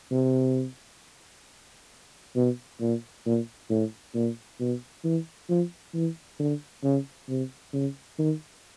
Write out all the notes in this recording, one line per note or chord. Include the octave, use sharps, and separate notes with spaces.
C3
B2
A#2
A#2
A2
A#2
B2
E3
F3
E3
D3
C#3
C3
C#3
D#3